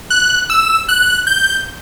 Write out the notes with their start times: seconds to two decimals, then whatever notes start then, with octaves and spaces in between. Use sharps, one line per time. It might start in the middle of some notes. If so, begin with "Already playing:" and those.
0.10 F#6
0.50 E6
0.89 F#6
1.27 G6